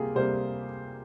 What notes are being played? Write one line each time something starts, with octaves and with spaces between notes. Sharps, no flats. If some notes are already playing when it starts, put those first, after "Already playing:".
Already playing: C3 G3 A#3 F4 G4 G#4
C3 G3 A#3 C5